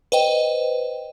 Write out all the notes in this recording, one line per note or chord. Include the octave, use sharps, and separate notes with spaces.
B4 C5 D#5 G5